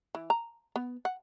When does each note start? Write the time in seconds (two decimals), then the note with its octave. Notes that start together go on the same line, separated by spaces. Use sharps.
0.15 E3
0.30 A#5
0.76 B3
1.05 F#5